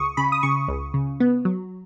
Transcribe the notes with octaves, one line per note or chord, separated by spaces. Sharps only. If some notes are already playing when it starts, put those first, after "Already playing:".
Already playing: C#2 C#6 D#6
C#3 B5
D#6
C#3 C#6
C#2
C#3
B3
F#3